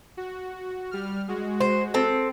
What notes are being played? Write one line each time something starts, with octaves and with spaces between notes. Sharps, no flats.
F#4
G3 F6
G#3 F#4
C5
C4 A4